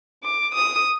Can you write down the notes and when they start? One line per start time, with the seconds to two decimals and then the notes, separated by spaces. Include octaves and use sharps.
0.24 D6
0.55 D#6